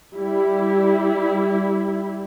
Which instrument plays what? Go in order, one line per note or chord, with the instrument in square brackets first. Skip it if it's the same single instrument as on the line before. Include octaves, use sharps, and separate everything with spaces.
[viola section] G3 E4